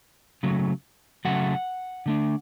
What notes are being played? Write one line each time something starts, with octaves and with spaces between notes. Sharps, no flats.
C#3 F#3 A3
C#3 F#3 A3 F#5
D3 A3 D4